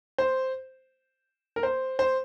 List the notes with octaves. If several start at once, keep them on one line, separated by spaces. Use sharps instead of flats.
C5
A#4
C5
C5